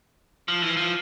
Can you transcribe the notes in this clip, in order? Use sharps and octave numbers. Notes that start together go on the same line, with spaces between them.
F3
E3
F3